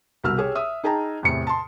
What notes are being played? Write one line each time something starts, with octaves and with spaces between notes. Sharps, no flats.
C2 B2 E6 F6
G4 G#4 C#5
E5 D#6
D#4 G#4 G5 A5 A#5
E2 A2 C3 C#7
A5 C6